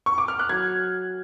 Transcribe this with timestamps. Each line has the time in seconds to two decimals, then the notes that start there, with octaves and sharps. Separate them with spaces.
0.06 C#6
0.18 D6
0.28 F6
0.39 F#6
0.49 F#3 G#6